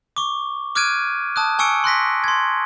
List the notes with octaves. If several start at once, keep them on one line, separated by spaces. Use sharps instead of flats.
C#6 D6
D6 F6 F#6 G#6 D7 D#7
A5 D#6 F#6
G#5 C#6 E6 C#7 D7
C6 F#6 A#6 B6
C6 G#6